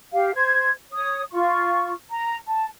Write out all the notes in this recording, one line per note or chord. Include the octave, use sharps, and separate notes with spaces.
G4 F5
C5 G#6
C#5 D#6
F4 C#6
A#5
A5